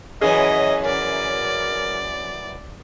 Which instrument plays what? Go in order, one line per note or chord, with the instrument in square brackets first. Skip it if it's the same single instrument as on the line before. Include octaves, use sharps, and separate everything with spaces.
[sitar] F#2 E3 C#4 [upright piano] G#4 [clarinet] D#5
[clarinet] A#4 [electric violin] D5